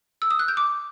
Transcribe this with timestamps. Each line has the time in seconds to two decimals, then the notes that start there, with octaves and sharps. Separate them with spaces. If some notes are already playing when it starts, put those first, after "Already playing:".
0.22 E6
0.31 D#6
0.39 F#6
0.48 G6
0.57 D6